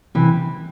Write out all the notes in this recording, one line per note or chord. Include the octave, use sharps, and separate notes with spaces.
C3 E3